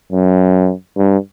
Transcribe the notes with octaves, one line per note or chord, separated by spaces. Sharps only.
F#2
G2